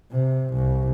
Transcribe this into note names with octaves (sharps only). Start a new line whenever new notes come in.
C3
C2